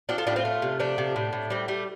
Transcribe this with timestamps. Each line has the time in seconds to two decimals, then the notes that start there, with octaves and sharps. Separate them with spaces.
0.09 F3 D4 G4
0.18 F4 A4
0.27 A2 D4 G4
0.36 C4 F4
0.45 A3
0.62 C3
0.80 F3 A3 D4
0.98 C3
1.16 A2
1.33 A2
1.50 G3 C4
1.68 G3 A3